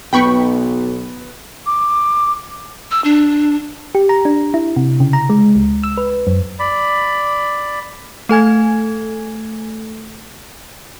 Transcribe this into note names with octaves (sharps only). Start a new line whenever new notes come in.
B1 B3 G5 B5 C#6
D6
E6
D4
G4
A#5
D4
E4
C3
C#3
A#5
G#3
C#2
E6
B4
F#2
D5 B5
A3 A4 G#5 G#6